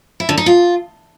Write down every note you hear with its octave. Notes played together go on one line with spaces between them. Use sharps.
E4
D3
D#4
F4